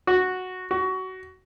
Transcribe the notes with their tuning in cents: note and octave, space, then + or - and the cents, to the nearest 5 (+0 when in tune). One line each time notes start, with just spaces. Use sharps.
F#4 -5
F#4 +20